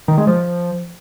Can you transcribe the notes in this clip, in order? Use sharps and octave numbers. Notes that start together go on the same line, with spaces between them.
D#3
G#3
F3